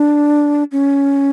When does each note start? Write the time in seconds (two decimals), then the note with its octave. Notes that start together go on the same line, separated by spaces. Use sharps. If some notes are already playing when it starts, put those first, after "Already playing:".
Already playing: D4
0.72 C#4